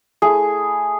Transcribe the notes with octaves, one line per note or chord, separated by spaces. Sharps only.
A3 E4 G#4